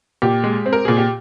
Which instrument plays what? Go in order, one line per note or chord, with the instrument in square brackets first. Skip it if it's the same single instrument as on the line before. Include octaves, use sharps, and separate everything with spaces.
[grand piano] A#2 G4
G#3
C4
A#4
A#2 G#4
G4